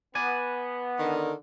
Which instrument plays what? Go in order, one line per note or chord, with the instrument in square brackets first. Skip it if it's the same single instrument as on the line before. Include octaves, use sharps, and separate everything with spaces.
[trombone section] B3 [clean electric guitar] D5 G#5
[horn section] D3 D#3